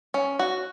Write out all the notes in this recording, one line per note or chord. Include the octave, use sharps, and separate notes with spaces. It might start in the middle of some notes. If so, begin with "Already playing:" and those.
C#4
F#4